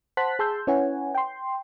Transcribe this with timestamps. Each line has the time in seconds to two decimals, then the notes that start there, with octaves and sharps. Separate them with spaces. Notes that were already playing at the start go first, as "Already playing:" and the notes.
0.17 C5 F#5 A5 C6 F#6 B6
0.39 G#4 A5 C6 E6 G6
0.67 C#4 E4 B4 C#5 F#5 G#5
1.15 G5 C6